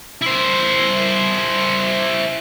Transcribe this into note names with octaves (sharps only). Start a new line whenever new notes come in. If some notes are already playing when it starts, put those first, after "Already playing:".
E4 C5